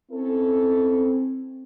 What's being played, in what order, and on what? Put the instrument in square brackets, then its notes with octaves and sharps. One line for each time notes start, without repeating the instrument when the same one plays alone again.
[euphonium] C4 [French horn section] C#4 E4 A4